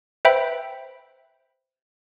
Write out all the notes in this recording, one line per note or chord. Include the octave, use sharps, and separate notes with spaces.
B4 C5 E5 G5 B5